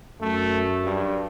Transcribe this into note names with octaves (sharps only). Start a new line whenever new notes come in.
F#2 A3
G2